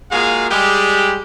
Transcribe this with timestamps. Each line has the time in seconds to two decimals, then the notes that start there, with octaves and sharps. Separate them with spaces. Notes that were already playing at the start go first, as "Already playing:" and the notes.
0.12 G#3 A#3 F4 F#4 G#4 F5
0.51 G3 G#3 G4